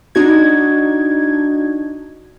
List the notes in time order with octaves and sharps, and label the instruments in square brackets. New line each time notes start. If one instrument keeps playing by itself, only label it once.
[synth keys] D4 D#4 F#4 G#6